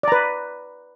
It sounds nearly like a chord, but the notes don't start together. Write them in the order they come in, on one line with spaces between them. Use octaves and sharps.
D5 A#5 B4